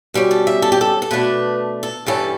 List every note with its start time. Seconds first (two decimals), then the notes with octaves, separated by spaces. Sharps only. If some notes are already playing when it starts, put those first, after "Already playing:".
0.14 B2 G3 C#4
0.31 A4
0.47 E5
0.62 A4
0.72 G4
0.81 A4
1.02 A4
1.11 B2 A3 D4 B4
1.83 A4
2.06 G2 E3 G3 C#4 A4